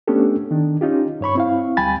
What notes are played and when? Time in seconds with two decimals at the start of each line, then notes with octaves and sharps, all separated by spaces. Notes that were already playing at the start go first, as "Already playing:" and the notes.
0.08 A3 B3 C#4 D4 G4 A4
0.51 D#3 D4
0.81 C#4 D#4 F4 G4
1.21 G2 C#5 B5 C#6
1.35 C4 E4 F5
1.77 D2 G3 G5 G#5 B5 A6